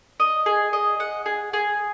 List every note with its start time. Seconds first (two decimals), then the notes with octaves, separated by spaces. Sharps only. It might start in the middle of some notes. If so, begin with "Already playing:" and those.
0.20 D#5
0.46 G#4
0.73 D#5
1.00 F#5
1.26 G#4
1.53 G#4